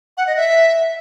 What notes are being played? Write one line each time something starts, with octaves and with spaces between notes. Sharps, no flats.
F#5
D#5
E5